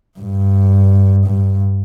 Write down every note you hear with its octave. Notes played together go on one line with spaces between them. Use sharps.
G2
G2